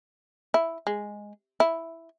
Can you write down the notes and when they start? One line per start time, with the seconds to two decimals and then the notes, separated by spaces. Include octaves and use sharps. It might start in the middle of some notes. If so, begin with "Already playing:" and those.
0.54 E4
0.87 G#3
1.60 E4